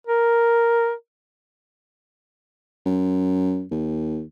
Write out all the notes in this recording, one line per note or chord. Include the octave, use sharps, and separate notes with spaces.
A#4
F#2
D#2